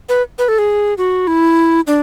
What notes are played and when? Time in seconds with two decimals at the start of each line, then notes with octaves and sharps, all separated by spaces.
0.09 B4
0.38 B4
0.48 A4
0.59 G#4
0.98 F#4
1.27 E4
1.87 D4